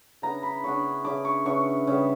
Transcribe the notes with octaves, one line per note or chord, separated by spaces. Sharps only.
C#3 E3 B3 D4 A#5
B5
C#3 E3 B3 D4 C#6
C#3 E3 B3 D4 D6
C#6
C#3 E3 B3 D4 C#6
C#3 G3 B3